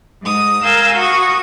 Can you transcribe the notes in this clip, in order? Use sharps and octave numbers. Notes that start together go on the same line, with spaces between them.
G#2 D#6
A#4 F5 G#5 E6 G6
F#4 C#6 D#6